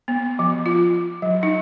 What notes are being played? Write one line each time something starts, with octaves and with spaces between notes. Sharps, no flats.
B3
F3
F4
F#3
D#4